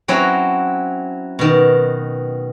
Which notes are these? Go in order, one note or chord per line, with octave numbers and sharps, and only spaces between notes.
F#3 C4 C#4 E4 A#5
B2 D#3